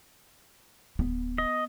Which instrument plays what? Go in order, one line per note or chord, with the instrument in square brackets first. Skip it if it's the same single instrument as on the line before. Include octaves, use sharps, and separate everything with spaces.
[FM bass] D1 [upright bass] B3
[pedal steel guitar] D#5